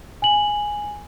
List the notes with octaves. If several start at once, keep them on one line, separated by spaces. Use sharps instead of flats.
G#5 F#7